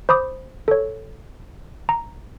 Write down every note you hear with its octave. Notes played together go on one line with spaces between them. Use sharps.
C5 B5 D6 D#6
A4 C#5
A#5